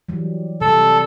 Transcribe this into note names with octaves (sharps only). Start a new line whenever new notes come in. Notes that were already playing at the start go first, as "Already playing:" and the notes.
E3 F#3 G3
C3 G3 A4